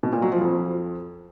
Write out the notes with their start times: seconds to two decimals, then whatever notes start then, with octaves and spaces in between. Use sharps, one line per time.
0.03 B2
0.13 A#2
0.22 F#3
0.32 F3
0.41 F2